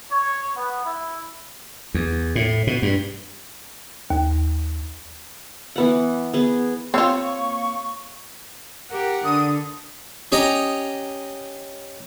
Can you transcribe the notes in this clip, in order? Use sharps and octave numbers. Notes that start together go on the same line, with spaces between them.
C#5
B3
E4
E2
A2
B2
G2
D#2
E3 B3 F#5
B3 G#4
A#3 C4 F4 C#5 C#6 E6
G4 A#4 F#5
D3 D#6
C#4 G4 D#5 A#5